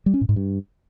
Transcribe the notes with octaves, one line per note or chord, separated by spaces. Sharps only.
G3
C#4
A2
G#2
G2